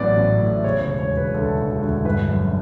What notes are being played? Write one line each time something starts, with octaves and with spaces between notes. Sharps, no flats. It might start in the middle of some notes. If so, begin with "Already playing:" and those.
Already playing: A1 A2 F#3 B3 D5
A1
A2
C#3 C#5
C#5
E1
C#5
E1
B4
D2 A4
E1
D2
G1 B4
F#2